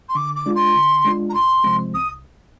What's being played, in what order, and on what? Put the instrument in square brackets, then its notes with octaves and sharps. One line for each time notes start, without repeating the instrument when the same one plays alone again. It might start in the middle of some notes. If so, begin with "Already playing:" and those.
[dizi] C6
[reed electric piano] D3 [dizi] D6
[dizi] D6
[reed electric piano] G#3 D4 F4
[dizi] C6
[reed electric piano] D3
G#3 D4 F4
[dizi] A#5
[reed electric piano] C2 [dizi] C6
[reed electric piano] C3 F3 G#3 C4
[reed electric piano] C2 [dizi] D#6